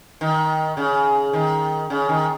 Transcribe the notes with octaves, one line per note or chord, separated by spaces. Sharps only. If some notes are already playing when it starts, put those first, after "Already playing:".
D#3
C#3
D#3
C#3
D#3